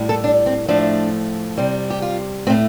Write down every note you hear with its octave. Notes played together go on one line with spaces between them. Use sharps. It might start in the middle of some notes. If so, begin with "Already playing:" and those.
Already playing: A2 G3
A4
D4
C4
A2 F3 A3 D4
C3 G3
G4
F4
A2 A3 C4